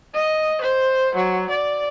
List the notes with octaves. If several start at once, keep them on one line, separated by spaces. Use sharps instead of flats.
D#5
C5
F#3
D5